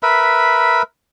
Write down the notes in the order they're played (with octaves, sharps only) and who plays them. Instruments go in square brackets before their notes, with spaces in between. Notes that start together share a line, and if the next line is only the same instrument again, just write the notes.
[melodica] A#4 B4 E5 B5